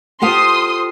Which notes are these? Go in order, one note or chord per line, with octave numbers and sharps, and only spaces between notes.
F4 G4 A4 C5 C6 D#6